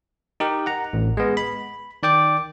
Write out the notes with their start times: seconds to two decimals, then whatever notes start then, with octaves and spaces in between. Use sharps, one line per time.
0.40 D#4 G4 A#4
0.66 F#5 A#5
0.93 A1
1.17 G#3 B3
1.37 B5
2.03 D#3 D5 G5 D6